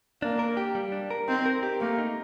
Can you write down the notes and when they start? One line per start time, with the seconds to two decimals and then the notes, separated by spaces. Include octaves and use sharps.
0.22 A#3 D4
0.39 A#4
0.57 G4
0.75 G3
0.92 D4
1.11 A#4
1.28 C4 D#4
1.46 A#4
1.63 G4
1.80 A3 A#3
1.98 D#4